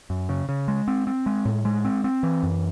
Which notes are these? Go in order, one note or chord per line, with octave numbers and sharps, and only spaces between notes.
F#2
C#3
C#3
G#3
C4
C4
G#3
A2
G#3
C4
C4
E3
F#2